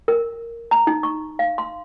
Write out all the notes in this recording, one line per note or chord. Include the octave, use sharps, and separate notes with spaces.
A#4
A#5
D#4
C#6
F5
C6